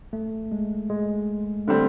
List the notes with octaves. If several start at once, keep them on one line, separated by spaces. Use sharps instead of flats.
A3
G#3
G#3
D3 G3 A3 C4